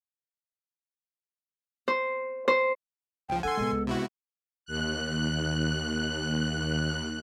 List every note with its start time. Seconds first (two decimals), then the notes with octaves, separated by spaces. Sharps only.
1.88 C5
2.48 C5
3.29 C#2 F3 G5
3.43 F3 D4 A4 F#5 G#5 C6
3.57 A#2 C#3 G#3 B3
3.71 C#2
3.87 C3 E4 F#4
4.66 D#2 F#6